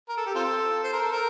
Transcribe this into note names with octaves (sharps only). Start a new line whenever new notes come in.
A#4
A4
G4
C4 F4 A4
C5
A#4
A4
A#4